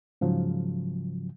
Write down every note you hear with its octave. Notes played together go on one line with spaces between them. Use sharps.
G#2 C#3 F3 F#3